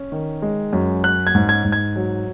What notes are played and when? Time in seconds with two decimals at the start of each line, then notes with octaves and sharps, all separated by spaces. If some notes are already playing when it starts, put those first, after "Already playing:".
Already playing: C#4
0.12 D#3
0.42 G#3
0.73 F#2
1.04 C#4 F#6
1.27 G#6
1.35 G#2
1.49 G#6
1.65 G#2
1.72 G#6
1.96 F#3